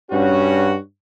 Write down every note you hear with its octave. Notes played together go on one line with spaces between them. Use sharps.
G2 C#4 F#4